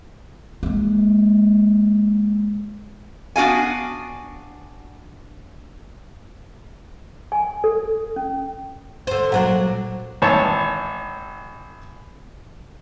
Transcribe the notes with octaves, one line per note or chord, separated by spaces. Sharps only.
G#3 A#3
B3 D4 F#4 F5 G#5
G#5
A4
C#4
D3 C5
A#2 F#3 D4
G#1 E3 C#5 A5